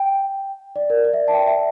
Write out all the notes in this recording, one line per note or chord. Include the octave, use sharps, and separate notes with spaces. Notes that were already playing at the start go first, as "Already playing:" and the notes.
Already playing: G5
D5
A#4
D5
E5
A5
G5
E5